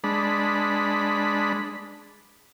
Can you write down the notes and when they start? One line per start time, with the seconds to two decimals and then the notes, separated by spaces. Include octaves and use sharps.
0.04 G#3 D4 B5